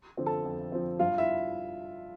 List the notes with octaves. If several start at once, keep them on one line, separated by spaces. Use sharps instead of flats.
D3 F3 C4
A4 A5
F2
D3 F3 C4
G2 F4 F5
E4 E5